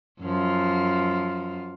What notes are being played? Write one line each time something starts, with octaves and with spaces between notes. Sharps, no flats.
F#2 F3 F4